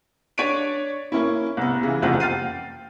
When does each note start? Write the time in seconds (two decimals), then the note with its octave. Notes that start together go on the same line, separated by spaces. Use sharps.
0.38 D4 C#5 D5 B6 D7 D#7
1.12 A#3 C#4 E4
1.57 C2 B3
1.83 C#3 E3
2.02 F#1 C2 F2 F4 F#5
2.20 G5 F6 A6 C7 D#7